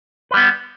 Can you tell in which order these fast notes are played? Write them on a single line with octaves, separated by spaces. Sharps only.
B4 G3 B3